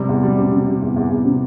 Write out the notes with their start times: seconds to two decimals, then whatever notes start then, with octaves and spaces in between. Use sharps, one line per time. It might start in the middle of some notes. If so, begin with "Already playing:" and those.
Already playing: C3 G3
0.09 E2
0.23 G3
0.38 C3
0.52 C3
0.67 C3
0.82 E2
0.96 E2
1.10 E2
1.25 C3